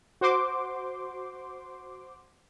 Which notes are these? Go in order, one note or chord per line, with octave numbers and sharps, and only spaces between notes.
F#4 C5 C6 D6